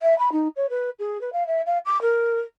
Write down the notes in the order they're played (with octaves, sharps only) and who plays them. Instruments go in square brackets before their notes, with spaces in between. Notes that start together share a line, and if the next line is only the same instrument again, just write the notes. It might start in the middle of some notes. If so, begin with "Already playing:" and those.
[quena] E5
B5
D#4
C#5
B4
G#4
B4
F5
E5
F5
D6
A#4